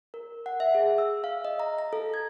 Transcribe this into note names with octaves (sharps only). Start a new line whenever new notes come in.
A#4
F#5
E5
G#4
E6
F5
D#5
A#5
A#5
A4
G#6